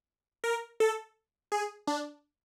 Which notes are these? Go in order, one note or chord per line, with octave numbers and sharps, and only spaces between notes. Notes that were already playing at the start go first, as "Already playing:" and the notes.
A#4
A4
G#4
D4